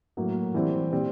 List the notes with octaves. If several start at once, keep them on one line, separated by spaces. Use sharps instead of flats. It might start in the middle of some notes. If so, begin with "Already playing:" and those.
A2 F#3 A#3
E3 G3 C4
A#2 G3 C4